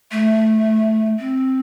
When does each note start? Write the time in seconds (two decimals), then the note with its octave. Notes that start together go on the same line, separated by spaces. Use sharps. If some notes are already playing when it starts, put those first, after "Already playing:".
0.12 A3
1.19 C4